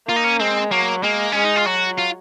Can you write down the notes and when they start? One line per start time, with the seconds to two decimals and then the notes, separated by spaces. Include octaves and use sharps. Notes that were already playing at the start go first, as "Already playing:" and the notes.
0.08 A#3 F4
0.16 D#4
0.24 C#4
0.40 G#3 C4
0.71 F#3 A#3
1.03 G#3 A#3
1.32 G#3 C#4
1.44 D#4
1.56 F4
1.67 F#3 F#4
1.99 F4